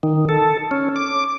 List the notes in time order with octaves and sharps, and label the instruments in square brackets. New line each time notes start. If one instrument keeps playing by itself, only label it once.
[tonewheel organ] D#3
A4
C#4
D6